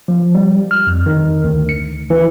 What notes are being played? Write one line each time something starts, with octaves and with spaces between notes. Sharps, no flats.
F3
G3
F6
F2
D#3
D2
C#7
E3